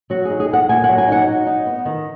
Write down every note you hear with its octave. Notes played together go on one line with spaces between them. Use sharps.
F#3 F#4
D#4 G#4
G#4
B3 F#5
A#2 G#5
F#3 F#5
G#5
D#4 F#5
F#3
D#4
B3
D#3